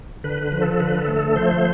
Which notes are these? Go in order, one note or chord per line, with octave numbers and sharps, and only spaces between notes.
D3 B4
B4
F3
A4
D3 B4
A4
A3
A4
F3 C5